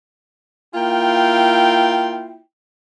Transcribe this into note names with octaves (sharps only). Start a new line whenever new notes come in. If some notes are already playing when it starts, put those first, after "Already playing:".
A#3 E4 F4 G5